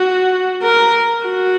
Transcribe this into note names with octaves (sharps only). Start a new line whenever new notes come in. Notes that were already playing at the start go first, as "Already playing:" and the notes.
Already playing: F#4
A#4
F#4